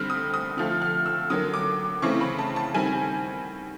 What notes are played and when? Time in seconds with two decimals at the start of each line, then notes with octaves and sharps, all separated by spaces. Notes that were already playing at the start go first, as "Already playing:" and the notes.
Already playing: D3 G3 C4 F6
0.10 D#6
0.34 D#6
0.57 D3 F3 A3 F6
0.82 F6
1.06 E6
1.30 D3 F#3 A#3 D#6
1.54 D6
2.02 C#3 E3 A3 C4 C#6
2.21 B5
2.39 A5
2.56 A5
2.74 D#3 G3 C4 G#5